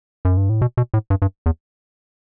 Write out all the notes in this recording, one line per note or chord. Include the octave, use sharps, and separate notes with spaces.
F#2
G2
A2
B2
B2
A2
G2
G2
E2